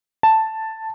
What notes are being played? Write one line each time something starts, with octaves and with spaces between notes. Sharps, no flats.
A5